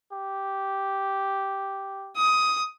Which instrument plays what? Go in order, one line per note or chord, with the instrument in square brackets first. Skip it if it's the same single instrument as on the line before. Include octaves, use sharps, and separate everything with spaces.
[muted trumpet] G4
[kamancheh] D#6